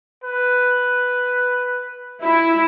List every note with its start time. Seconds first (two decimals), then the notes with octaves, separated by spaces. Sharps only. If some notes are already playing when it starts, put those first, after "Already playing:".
0.24 B4
2.23 E4